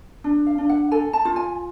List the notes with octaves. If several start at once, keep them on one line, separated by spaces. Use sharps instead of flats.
D4
F5
D4
F#5
A4 G#5
A5
F4
G#5